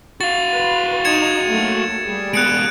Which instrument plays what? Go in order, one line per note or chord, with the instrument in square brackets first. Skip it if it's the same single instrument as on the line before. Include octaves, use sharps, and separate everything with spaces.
[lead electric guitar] F#4 F5 [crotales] A6
[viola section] B4 C6
[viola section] D#4 [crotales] G#6 C#7 E7
[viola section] F#3 A3 A#3
G3 G#4
[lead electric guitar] G#3 B3 [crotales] F#6 C#7 D7